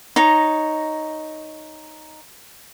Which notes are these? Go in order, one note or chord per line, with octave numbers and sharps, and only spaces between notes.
D#4 C#5 A#5